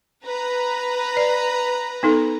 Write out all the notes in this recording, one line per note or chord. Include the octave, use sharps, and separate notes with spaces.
B4 A#5
D5
B3 D#4 A4